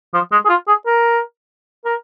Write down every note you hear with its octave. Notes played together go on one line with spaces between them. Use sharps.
F3
G#3
G#4
F4
G#4
A#4
A#4